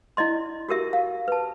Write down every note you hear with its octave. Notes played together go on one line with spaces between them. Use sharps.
E4 D5 D#5 C6
F#4 G4 A#4 E5
F5
B4 A5